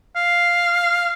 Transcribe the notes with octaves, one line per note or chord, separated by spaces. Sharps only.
F5